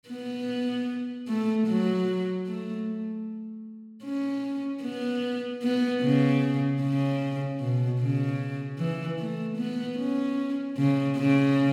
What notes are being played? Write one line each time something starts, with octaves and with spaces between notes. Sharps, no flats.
B3
A3
F#3
A3
C#4
B3
B3
C#3
C#3
B2
C#3
E3
A3
B3
C#4
C#3
C#3